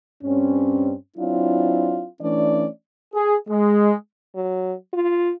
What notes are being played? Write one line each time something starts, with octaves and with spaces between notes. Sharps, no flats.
G2 C4 C#4
F#3 C4 D4 E4 F4
E3 A3 C#4 D4 D5
G#4
G#3
F#3
F4